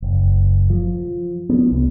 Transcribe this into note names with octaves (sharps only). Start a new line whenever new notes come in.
F#1
F3
B3
C2